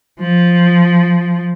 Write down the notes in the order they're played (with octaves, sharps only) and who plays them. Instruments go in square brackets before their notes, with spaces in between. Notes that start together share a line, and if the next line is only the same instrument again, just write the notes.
[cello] F3